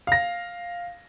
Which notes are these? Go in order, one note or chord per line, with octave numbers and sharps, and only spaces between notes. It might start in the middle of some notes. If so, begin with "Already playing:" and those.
F5 A#6